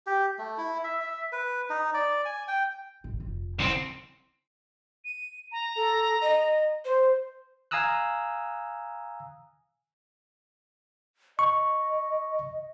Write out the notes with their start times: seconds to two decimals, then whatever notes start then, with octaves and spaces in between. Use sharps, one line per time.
0.06 G4
0.39 A3
0.58 E4
0.84 E5
1.01 E5
1.32 B4
1.70 D#4
1.94 D5
2.25 G#5
2.48 G5
3.04 A1
3.20 F1
3.59 C2 D3 C4 E4
5.05 D#7
5.52 A#5
5.76 A4
6.21 D#5
6.85 C5
7.71 F5 G#5 A#5 D#6 E6 F#6
11.39 D#5 C#6